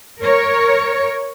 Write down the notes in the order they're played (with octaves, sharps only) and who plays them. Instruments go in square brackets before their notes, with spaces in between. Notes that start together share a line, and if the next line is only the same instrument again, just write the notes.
[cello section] A#4 C#5